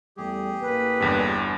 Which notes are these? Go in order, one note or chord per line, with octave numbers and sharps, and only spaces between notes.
E2 G3 A3 G4 G#4
A1 A#3 B4
G1 E2 G2